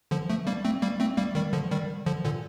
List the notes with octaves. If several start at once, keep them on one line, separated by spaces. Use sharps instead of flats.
D3 F3
F3 A3
G3 A#3
A3 C4
G3 A#3
A3 C4
G3 A#3
D#3 G3
D3 F3
D#3 G3
D3 F3
A#2 D3